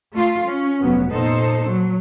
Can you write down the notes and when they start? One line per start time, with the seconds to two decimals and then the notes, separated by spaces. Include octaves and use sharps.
0.14 A3 F4
0.48 C#4
0.81 F1 F#3 B3
1.12 A#2 D#4 A4 C5
1.70 F#3